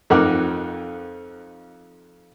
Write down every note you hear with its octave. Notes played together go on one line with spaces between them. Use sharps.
F2 D#4 A#4 F#5 D6